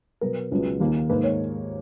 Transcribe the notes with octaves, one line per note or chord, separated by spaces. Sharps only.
B2 F#3 B3 A#4
C#2 C#3 F#3 B3
D#2 D#3 A#3
G#2 D#3 A#3 B4
C#5